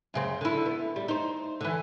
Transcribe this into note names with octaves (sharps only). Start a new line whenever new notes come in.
F#2 C#3 C4
D3 E4
B3
G3
D#4 C5
D3 E3